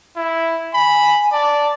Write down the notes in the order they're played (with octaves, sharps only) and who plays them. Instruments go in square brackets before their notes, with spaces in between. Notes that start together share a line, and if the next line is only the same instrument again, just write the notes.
[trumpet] E4
[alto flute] G#5 [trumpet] B5
[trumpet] D5 [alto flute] A5